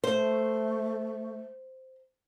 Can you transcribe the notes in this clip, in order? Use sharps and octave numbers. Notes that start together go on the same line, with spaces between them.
A3 C5